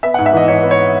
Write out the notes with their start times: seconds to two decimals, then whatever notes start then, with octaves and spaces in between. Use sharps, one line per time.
0.03 B3 E5
0.14 F#5
0.18 G#2
0.26 E5
0.33 E3 D#5
0.48 G#2 C#5
0.63 B3
0.71 C#5